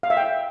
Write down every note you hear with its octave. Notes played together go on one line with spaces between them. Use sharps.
F5
E5
G5